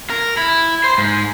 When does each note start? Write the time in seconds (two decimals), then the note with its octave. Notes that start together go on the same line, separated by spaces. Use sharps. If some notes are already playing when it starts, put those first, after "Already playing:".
0.10 A#4
0.37 E4
0.84 C5
0.98 G#2